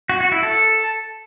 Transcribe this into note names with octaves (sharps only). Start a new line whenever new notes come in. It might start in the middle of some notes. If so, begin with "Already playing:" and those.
F#4
F#4
E4
A4